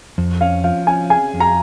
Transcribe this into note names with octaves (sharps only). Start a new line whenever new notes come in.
F2
C#4 F5
F3 F5
C#4 G#5
G#4 G#5
F2
A#5